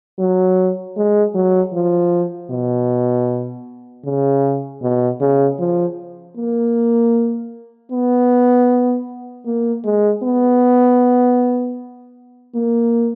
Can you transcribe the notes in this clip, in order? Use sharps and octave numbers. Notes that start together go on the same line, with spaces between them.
F#3
G#3
F#3
F3
B2
C#3
B2
C#3
F3
A#3
B3
A#3
G#3
B3
A#3